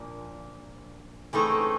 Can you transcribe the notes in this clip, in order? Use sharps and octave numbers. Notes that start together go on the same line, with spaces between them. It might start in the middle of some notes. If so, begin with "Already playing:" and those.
Already playing: A#2 F3 A#3 D4
C#3 E3 A3 C4 D#4